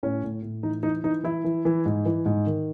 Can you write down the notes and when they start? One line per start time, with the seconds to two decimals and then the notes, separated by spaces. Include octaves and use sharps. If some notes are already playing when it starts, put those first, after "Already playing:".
0.03 A2 C#4
0.23 A2
0.42 A2
0.63 E3 D#4
0.83 E3 D#4
1.04 E3 D#4
1.24 E3 E4
1.44 E3
1.65 E3
1.85 G#2
2.05 E3
2.26 G#2
2.46 D#3